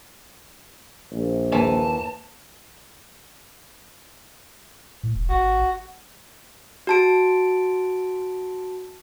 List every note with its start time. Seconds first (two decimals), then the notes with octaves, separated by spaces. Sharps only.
1.11 A#1
1.52 D#2 E3 G#5 A5
5.03 A2
5.15 E1
5.30 G#1 F#4
6.87 F#4 A5 D7